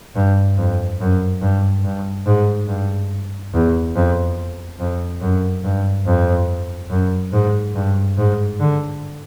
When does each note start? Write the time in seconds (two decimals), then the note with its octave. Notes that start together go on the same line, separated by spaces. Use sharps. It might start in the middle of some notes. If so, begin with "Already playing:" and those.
0.15 G2
0.58 F2
1.00 F#2
1.42 G2
1.84 G2
2.26 G#2
2.68 G2
3.53 E2
3.96 F2
4.80 F2
5.21 F#2
5.64 G2
6.06 F2
6.90 F#2
7.33 G#2
7.75 G2
8.18 G#2
8.60 D3